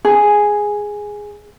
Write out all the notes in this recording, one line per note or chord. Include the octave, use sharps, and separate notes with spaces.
G#4